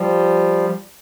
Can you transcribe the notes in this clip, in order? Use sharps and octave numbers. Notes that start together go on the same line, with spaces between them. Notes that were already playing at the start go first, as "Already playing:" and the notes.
Already playing: F3 G3